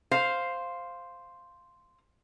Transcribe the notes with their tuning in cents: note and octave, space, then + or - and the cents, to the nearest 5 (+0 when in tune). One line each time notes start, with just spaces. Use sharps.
C5 +0 F5 +0